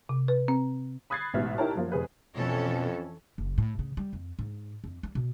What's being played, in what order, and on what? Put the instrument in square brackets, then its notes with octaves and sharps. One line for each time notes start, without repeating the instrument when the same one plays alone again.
[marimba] C3
B4
C4
[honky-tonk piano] B5 D#6 F#6 G#6 A6 C7
A1 G#2 B2 B3 E5 F6
D#4 E4 G4 A#4 C#5 A5
F#2 F3 A#3
F1 G#4 B4
[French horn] F2 [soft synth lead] B2 [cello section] E3 C#4 A4
[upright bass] F#1
A2
C#3
G3
F2
G#2
F2
G3
B2